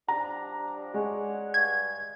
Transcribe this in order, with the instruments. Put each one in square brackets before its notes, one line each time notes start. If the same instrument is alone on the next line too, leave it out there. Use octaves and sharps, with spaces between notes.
[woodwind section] F3 G3 D4 [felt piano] A#5
[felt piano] G#3 [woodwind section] C#5 D5 F#5
[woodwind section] G2 [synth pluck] G#6